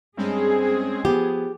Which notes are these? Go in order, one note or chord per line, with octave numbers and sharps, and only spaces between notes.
G2 G#3 C4 C#4 G#4
F3 B3 G4